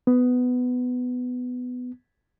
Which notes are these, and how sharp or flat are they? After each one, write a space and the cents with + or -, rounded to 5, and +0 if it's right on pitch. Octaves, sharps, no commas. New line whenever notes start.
B3 +15